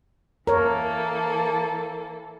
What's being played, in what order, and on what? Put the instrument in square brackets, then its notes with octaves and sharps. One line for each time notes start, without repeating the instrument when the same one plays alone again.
[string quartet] E3 A#3 A4 [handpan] A#4 C#5